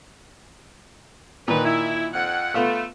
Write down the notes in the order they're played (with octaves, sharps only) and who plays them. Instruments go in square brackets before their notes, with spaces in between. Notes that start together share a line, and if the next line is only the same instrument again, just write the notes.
[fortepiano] A#2 D#3 [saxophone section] B4
[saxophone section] E4
F2 F#5
[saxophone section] A3 [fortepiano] B3 F4 A4